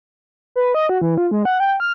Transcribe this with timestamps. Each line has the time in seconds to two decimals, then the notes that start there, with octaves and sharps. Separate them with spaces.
0.56 B4
0.74 D#5
0.89 F#4
1.02 E3
1.17 F4
1.31 G#3
1.45 F#5
1.60 G5
1.80 F6